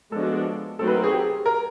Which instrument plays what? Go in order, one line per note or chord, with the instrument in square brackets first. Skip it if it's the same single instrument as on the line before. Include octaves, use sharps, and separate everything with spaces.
[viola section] F3 G#3 B3 D4 F#4 [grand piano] A4
[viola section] F#3 A3 C4 D#4 F#4 [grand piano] A4
[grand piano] B4
A#4
G#4
G4
G#4
A#4